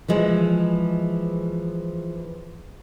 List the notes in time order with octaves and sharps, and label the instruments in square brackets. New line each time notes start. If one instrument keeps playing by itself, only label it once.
[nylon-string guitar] E3 F3 G#3